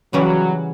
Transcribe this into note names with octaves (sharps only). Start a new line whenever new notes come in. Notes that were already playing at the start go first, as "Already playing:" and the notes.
C#3 E3 F#3 G3 C#4